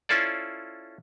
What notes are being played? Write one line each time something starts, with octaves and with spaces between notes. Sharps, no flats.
C#4 E4 F4 A4 C5 D5